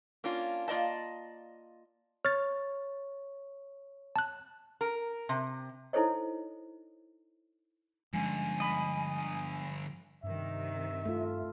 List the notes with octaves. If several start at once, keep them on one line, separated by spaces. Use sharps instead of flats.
A#3 C#4 D4 F4
A#3 F4 D5 D#5 A5
C#5 F6 A6
A5 F#6
A#4
C3
D#4 E4 A4 C5 C#5 D#5
G2 D3 F3 G#3 C#4 G#5
D#5 B5
G2 C3 D#3 E5
A3 F4